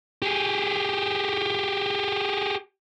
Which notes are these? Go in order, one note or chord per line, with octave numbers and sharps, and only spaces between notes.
G4 G#4